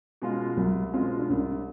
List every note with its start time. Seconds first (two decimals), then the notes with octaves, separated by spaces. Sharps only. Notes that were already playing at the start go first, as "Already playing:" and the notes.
0.22 B2 G#3 C#4 F4
0.57 C2 F#3
0.93 B2 G#3 C4 C#4 F4
1.20 D4
1.30 C2 C#4